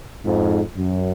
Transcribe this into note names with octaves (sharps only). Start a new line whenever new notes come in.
F2 G#2
F#2